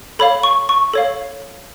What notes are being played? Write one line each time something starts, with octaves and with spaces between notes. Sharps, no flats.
A4 C#5 F5 B5
C#6
C#6
A4 C#5 F5